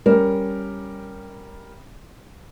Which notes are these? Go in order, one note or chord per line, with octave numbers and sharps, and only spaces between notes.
G3 C#4 A#4